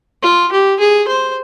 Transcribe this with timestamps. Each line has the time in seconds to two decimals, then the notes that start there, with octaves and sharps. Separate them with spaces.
0.22 F4
0.52 G4
0.80 G#4
1.07 C5